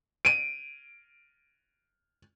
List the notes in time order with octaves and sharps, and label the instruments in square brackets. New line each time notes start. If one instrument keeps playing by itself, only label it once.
[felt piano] D7 D#7